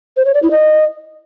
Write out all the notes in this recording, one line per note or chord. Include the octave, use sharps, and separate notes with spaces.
C5
C#5
D5
E4
D#5